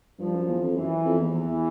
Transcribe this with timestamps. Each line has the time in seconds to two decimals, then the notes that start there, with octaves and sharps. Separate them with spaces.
0.19 G2 F3
0.33 F#2
0.47 E2
0.62 F2
0.76 F#2 E3
1.05 F2
1.19 E2
1.34 E2 E3